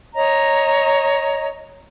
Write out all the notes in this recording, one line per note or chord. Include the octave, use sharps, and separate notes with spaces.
C#5 D#5 A#5